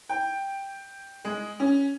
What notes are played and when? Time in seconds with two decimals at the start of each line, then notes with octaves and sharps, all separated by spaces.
0.09 G5
1.25 G#3
1.60 C#4